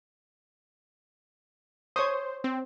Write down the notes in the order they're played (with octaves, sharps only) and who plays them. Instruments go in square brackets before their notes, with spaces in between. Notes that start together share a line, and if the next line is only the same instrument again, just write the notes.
[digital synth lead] C5 [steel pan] C#5 C#6 D#6
[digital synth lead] C4